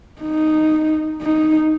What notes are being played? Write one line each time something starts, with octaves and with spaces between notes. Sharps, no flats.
D#4
D#4